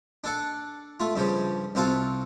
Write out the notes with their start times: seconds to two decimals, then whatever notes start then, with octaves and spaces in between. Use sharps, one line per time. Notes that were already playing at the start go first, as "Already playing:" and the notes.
0.24 D4 A4 F#5
1.00 A3 F4
1.16 G2 C#3 F3 G3
1.75 C2 C4 F4 F#4 A4 F5